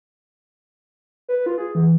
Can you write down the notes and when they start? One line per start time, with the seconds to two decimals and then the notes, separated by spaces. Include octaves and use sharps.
1.29 B4
1.46 F4
1.58 G#4
1.75 E3